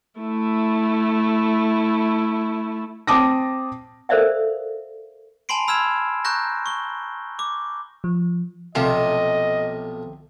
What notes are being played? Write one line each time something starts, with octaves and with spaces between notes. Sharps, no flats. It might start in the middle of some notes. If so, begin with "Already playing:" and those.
A3 E4
C4 A5 D6 D#6 A#6
A4 A#4 C5 D5 E5 F5
G#5 A5 B5 C6 C7 D7
B5 E6 F6 G#6 E7
A#5 C#6 F#6 G6 A#6
C#6 G7
D6
F3
B1 C3 F3 A3 F4 D#5